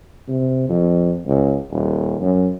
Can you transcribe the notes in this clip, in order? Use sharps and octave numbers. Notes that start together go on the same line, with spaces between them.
C3
F2
C#2
D#1
F#2